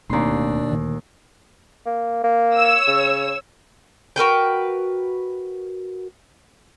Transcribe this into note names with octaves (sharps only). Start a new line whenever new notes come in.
D1 D#2 B2 A3 C4 D4 D5 C6
D2 A#2 D#3
A#3
A#3
C#5 E6
C#3
F#4 A#4 B4 G5